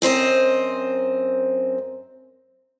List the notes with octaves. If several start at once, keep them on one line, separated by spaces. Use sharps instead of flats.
F#2 C4 C5 D#5